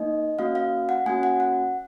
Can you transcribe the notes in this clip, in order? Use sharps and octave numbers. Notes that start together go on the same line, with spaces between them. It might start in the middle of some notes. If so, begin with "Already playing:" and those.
Already playing: A#3 D#4 D#5
A#3 C#4 F#4 F5
F5
F#5
A#3 C#4 F#4 G#5
F#5
F#5